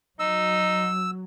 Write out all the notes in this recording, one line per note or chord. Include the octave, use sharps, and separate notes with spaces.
F#3 D#4 E6